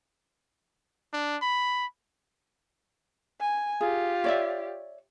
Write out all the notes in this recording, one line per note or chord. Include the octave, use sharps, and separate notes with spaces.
D4
B5
G#5
F4 G4 G#4
C#5 D5 E5